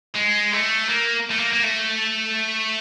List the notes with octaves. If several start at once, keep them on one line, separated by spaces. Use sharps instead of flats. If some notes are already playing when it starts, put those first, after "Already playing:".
G#3
A3
A#3
A3
A#3
A#3
A3